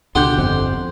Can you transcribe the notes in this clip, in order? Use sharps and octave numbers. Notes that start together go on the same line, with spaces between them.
C#2 B2 D3 G4 F#5 C6 G6
G1 F2